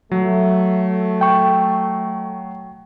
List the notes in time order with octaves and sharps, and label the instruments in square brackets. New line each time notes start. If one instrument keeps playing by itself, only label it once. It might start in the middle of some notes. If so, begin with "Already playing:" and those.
[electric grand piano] F#3 [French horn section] A3
[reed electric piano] G5 C#6